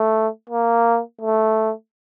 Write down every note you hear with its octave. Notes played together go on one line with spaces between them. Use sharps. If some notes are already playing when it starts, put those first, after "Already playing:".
Already playing: A3
A#3
A3